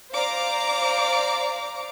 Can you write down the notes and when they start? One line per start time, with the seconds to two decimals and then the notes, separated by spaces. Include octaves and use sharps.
0.12 C5 D5 F5 A#5 D6